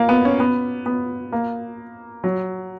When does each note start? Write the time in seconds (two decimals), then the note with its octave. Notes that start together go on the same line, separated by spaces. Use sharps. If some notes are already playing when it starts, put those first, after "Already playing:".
Already playing: A#3
0.09 B3
0.25 C#4
0.40 B3
0.86 B3
1.32 A#3
2.24 F#3